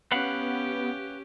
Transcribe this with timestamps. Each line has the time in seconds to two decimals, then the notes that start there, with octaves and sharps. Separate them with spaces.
0.12 B3 C#4 G4 B4 F5 F#5